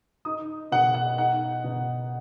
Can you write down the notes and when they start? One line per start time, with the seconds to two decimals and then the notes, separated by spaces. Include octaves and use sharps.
0.25 D#4 D#6
0.72 B2 F#5
0.94 F#5
1.18 D#4 F#5
1.64 B2